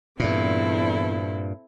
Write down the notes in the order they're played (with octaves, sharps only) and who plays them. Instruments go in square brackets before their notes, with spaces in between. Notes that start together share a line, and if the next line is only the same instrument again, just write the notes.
[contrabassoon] E2 [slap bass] G2 A#2 [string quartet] C4 E4 A4